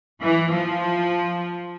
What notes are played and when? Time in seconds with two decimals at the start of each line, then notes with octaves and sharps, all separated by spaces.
0.23 E3
0.54 F3